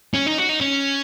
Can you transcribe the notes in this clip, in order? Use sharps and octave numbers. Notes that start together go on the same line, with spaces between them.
C#4
D#4
F#4
D#4
C#4